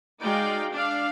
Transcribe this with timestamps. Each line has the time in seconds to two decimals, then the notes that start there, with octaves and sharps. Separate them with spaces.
0.22 G#3 D#4 F#4 D5 F5 G5
0.72 D4 D5 F5